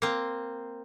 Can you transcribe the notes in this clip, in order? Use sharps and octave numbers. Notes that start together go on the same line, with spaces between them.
A#3 C4